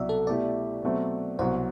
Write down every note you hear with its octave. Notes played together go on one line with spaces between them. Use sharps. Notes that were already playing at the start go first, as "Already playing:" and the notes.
Already playing: C2 B2 F#3 D5 E5
A4
B2 A3 E4 G4 D5
B2 F#3 A3 C4
C2 B2 F#3 C4 C5